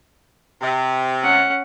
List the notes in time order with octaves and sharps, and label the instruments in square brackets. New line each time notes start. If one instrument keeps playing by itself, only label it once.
[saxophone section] C3
[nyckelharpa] C#4 F#5